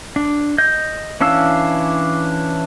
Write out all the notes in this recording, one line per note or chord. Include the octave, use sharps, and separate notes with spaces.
D4
D#5 G6
E3 C#4 D4 F5 E6